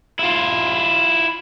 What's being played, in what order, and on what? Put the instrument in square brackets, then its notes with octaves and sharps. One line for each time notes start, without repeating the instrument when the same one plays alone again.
[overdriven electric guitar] E4 F4